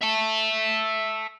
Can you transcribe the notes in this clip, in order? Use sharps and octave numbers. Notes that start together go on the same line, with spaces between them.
E5 A5